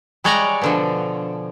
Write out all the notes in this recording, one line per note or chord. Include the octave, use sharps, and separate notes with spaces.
G3 G#3 C#5 D5 F#5 A#5
B2 D3 F3